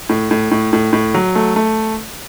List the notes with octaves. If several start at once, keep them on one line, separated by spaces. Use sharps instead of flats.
A2
A2
A2
A2
A2
F#3
A3
A3